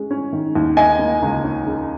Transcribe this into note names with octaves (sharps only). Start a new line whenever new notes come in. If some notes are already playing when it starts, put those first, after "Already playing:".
Already playing: G#3 C#4
C#4
D#3
D#2
A#3 D#5 G#5
A#3
C#2
C#4
C#3